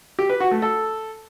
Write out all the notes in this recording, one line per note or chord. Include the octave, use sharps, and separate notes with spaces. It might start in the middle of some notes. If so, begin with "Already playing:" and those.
G4
B4
F#4
A3
A4